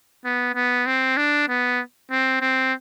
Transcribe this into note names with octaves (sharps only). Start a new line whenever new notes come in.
B3
B3
C4
D4
B3
C4
C4